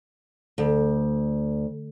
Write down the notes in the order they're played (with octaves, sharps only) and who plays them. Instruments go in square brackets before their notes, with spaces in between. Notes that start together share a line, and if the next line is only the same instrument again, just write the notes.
[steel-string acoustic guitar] D2